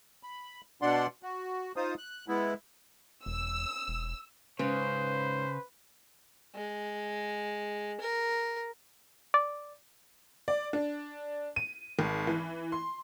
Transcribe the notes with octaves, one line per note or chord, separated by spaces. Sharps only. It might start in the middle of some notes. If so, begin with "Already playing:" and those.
B5
B2 D4 D5 F#5 C6
F#4
D#4 F4 C5 D#6
F#6
G#3 B3 E4
E1 E6
E1
G#2 C#3 C#4 B4 C5
G#3
A#4
D5
D5
D4
D#7
G#1
E3
C6